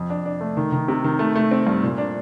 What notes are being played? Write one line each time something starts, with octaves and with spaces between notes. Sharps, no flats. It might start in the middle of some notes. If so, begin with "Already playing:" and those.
Already playing: F2
D4
D4
A3
D#3
D#3
C3
D#3
A3
A3
C4
G2
A#2
D4